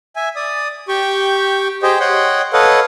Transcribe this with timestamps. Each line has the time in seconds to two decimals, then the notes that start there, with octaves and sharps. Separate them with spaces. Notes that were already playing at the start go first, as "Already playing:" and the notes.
0.16 E5 G#5
0.36 D5 D#6
0.88 G4 G5 C#6
1.83 G4 G#4 C5 D#5 G5
2.00 C#5 D#5 F#5 G5 C6
2.53 A4 B4 C#5 D#5 F5 F#5